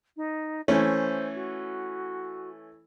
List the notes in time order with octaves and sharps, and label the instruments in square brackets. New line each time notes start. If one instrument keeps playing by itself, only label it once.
[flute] D#4
[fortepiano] E3 A3 C#4 [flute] C5
[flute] F#4